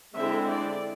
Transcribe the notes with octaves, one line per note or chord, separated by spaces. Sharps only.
D3 G#3 C4 E4 E5
D5